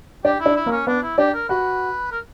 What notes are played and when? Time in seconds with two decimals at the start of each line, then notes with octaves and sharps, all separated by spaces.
0.24 D4 G4 D5
0.40 E4
0.46 D4 D5
0.56 E4
0.66 A#3 A#4
0.71 C#4
0.87 B3 D4 B4
1.03 E4
1.18 D4 G4 D5
1.34 A#4
1.49 F#4 B4 F#5
2.11 A#4